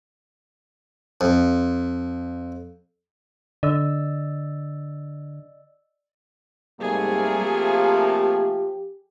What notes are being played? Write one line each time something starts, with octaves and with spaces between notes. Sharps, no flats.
F2
D3 D5 D#5 E6
G#2 C3 G3 A3 A#3 G#4
F3 G4